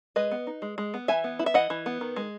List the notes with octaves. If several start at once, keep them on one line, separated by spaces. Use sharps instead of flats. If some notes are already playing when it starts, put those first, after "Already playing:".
G#3 B4 D#5
B3
D#4
G#3
G#3
B3
E3 E5 G#5
B3
E4
E5
E3 D#5 F#5
E3
B3
D#3
G#3